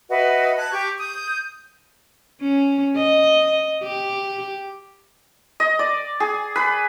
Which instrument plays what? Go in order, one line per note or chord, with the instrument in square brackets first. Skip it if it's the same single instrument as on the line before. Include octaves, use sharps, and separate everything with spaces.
[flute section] F#4 B4 D#5 E5
A5 F#6 G#6
G4 C#6 G6
D#6 G6
[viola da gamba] C#4
D#5
G4
[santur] D#5
D5
G#4
B4